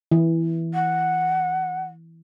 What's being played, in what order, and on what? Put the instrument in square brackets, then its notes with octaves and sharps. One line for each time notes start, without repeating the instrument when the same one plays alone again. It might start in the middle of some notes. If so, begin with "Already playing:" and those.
[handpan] E3
[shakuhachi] F#5